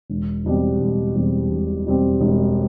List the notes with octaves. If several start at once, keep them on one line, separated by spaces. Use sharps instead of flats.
E1
E2 B2 G3 C4
E1
E2 B2 G3 C4
E1
E2 B2 G3 C4
E1